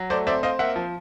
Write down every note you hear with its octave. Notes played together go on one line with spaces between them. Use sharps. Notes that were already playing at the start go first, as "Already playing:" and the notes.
Already playing: F#3
A3 C5 D5
C4 D5 E5
C4 D#5 F5
A#3 E5 F#5
F3